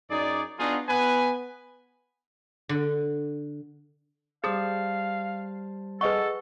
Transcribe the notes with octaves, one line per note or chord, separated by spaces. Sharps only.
F#2 D#4 G#4 D5
B3 D4 D#4 F4 F#4 G#4
B3 B4 G#5
D3
G3 G#4 C5 F5 A5 D#6
G#4 A4 B4 D#5 F#5 C#6